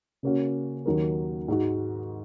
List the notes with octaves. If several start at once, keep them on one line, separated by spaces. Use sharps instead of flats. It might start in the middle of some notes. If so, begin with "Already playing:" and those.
C#3 A#3 C#4 F#4
D#2 D#3 F#3 D#4 A#4
G#2 G#3 D#4 F#4